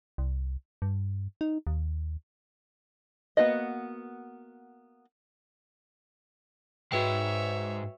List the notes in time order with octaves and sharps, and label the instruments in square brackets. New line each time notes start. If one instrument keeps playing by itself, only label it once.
[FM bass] C2
G2
D#4
D#2
[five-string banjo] A#3 B3 F#4 B4 D#5
[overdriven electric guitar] G#2 G#3 [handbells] F#4 B4 G5 [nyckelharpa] C#5 E5